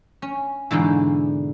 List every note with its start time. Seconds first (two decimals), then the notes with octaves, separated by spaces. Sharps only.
0.22 C#4
0.71 G#2 B2 D3 E3